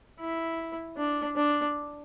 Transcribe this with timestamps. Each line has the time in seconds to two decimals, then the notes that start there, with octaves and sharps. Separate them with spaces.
0.20 E4
0.97 D4
1.36 D4